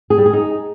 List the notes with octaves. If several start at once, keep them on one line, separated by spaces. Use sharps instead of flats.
G#4
G3
G#4
D#4